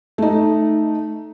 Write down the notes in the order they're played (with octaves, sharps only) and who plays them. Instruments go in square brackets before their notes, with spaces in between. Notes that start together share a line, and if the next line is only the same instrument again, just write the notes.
[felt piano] A3 D#4